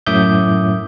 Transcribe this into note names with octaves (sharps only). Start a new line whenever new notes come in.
F#2 A2 E5 D6 D#6 G6